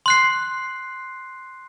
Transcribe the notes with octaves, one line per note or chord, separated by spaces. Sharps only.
C6 F#6 C7